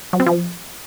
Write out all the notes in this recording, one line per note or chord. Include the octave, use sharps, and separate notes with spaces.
F#3
C4
F3